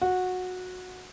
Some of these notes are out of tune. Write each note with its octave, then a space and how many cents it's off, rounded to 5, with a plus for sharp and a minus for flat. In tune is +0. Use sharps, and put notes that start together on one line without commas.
F#4 -15